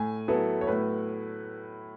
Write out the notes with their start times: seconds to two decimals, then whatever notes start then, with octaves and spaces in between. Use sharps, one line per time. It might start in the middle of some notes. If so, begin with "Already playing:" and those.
Already playing: A2 G#5
0.28 F#3 B3 E4 A4
0.61 C#5
0.67 A2 B4